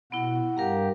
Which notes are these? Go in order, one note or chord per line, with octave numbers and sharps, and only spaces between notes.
B2 B3 E4 F#5
G2 G4 A#4 F5 A#5